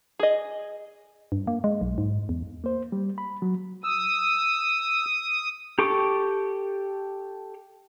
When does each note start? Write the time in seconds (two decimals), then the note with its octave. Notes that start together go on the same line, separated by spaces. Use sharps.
0.19 G#4 D#5
1.32 G2
1.47 A#3
1.64 G#3
1.81 B1
1.98 G#2
2.29 E2
2.64 A#3 C5
2.92 G3
3.18 B5
3.42 F#3
3.84 D#6 E6
5.79 G4 A4 C#6 D6